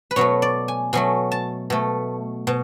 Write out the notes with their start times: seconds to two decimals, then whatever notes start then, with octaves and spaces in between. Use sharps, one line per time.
0.11 B4
0.16 B2 F#3 A3 C#5
0.42 D5
0.68 G#5
0.93 B2 F#3 A3 G#5
1.32 A5
1.70 B2 A3
2.47 B2